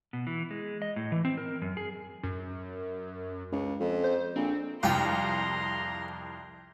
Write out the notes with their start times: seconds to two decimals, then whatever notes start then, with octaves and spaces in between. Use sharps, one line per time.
0.13 B2
0.27 E3
0.51 G#3
0.82 D#5
0.96 A2
1.12 E3
1.25 C4
1.38 A#4
1.62 F#2
1.77 G#4
2.23 F#2
3.52 C#2
3.80 F2
4.04 C5
4.36 A#1 C4
4.83 C2 F2 F4 G5 A#5 C6